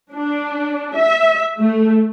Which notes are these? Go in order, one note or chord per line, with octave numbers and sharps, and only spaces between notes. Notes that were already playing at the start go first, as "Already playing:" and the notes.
D4
E5
A3